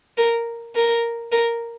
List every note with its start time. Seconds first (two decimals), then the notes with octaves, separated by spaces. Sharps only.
0.18 A#4
0.75 A#4
1.32 A#4